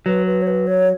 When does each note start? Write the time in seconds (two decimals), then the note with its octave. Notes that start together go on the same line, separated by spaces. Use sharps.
0.06 F#3 B4
0.26 B4
0.42 C#5
0.47 B4
0.67 C#5